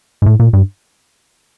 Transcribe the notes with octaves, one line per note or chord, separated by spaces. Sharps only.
G#2
A2
A#2
G2